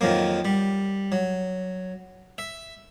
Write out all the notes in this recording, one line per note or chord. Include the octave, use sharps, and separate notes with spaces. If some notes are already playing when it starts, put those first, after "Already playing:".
F2 D#3 F3 F#3 A#3
G3
F#3
E5